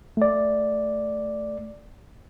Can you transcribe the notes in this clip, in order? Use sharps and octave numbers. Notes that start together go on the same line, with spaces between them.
A3 D5